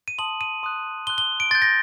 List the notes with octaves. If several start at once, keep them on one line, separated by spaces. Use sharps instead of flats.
D#7
A5 C6 D#6 F#7
D#7
C6 D#6 F#6
C6 F#6 G7
G7
D7
C6 G6 A6
A#6